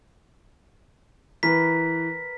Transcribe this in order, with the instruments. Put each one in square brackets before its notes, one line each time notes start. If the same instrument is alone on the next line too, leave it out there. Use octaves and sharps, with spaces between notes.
[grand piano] E3 [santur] A#4 B4 [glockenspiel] B6